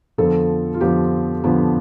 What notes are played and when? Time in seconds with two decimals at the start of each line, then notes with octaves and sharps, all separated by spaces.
0.18 F2 D3 F3 B3 A4
0.74 F4
0.81 F2 D3 F3 B3 G4
1.44 F2 D3 F3 B3